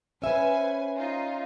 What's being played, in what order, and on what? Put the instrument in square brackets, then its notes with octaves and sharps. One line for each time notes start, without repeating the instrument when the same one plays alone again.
[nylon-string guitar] C#4 E5 [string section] B4 C5 G#5
[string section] D#4 F4